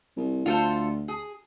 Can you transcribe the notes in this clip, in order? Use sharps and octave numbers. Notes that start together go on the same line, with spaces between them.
C2
D2 F4 A4 C5
G#4